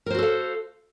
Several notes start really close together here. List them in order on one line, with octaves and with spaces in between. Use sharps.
A#4 C5 F#4 A4 F5